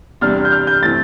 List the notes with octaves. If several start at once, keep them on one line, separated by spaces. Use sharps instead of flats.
E2 C3 G3 D4 F6
G6
F6
G6
E3 A3 C4 A6